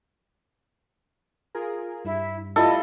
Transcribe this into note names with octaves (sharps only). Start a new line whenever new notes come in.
F4 G#4 A#4
G2 E4
G3 E4 F4 A4 D#5